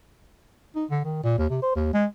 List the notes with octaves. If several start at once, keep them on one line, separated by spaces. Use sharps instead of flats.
D#4
D3
D#3
A#2
D#2
C3
C5
D#2
G#3